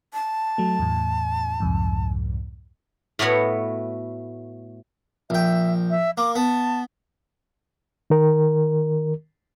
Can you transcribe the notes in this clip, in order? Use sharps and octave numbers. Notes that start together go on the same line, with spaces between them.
A5
F#3 A3
E2 A2
C2 F2 G#2
A2 A3 B3 F#4 C#5 B5
A#1 E5 G5
E5
A#3 D6
B3 A5
D#3 A#4